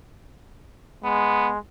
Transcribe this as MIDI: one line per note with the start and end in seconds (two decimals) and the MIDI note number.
1.04 1.58 56
1.04 1.49 59